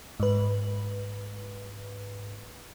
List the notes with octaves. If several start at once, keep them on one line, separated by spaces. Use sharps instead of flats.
G#2 B4